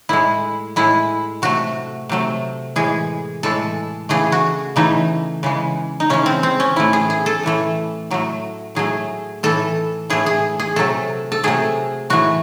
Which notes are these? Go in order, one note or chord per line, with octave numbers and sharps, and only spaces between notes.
A2 G#3 E4
A2 G#3 E4
C3 F#3 A3 F#4
C3 F#3 A3
A2 E3 G#3 G#4
A2 E3 G#3 A4
C#3 E3 A3 G#4
F#4
C#3 E3 A3 D#4
C#3 E3 G#3
D#4
C#3 E3 G#3 C#4
C4
C4
C#4
A2 E3 A3 E4
G#4
G#4
A4
A2 E3 A3
A2 F#3 A3
A2 F#3 A3 G#4
A2 E3 A3 A4
A2 E3 A3 G#4
G#4
G#4
C3 F#3 A3 A4
A4
C3 F#3 A3 G#4
A2 E3 A3 F#4